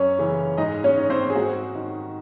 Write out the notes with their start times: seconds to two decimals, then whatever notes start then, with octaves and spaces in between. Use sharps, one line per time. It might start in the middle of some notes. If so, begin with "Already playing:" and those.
Already playing: F#2 C#4 C#5
0.19 C#3 E3
0.57 G#2 D#4 D#5
0.84 C#4 C#5
0.96 D#3
1.10 C4 C5
1.30 G#4
1.35 G#2 F#4
1.75 D#3